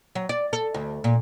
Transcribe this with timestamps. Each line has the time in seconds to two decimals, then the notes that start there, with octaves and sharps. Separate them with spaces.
0.15 F#3
0.29 D5
0.53 A4
0.74 D2
1.04 A#2